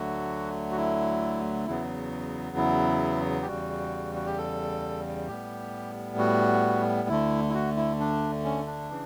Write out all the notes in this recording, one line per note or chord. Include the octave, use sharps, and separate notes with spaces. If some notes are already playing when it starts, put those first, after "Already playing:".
Already playing: D2 D3 F#3 A3 F#4
F#4
E4
E2 C#3 F#3 B3 E4
E4
G4
E2 C#3 G3 F#4
F#4
G4
A4
A2 G3 B3 G4
F#4
D2 D3 A3 E4
E4
F#4
E4
D4
C#4
D4
C#3 E3